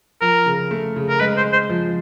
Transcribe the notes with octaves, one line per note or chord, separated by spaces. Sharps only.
F3 A#4
C#3
A3
C#3
A#4
G#3 B4
C5
G#3
C5
F3